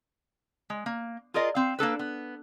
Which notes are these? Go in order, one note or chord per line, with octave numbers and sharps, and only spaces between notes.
G#3
A#3
F4 G#4 A#4 D5 D#5
C4 F5
A#3 D4 A4 B4
B3